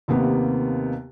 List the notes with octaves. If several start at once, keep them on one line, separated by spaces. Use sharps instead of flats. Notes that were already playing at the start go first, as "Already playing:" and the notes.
D#2 C3 A#3 B3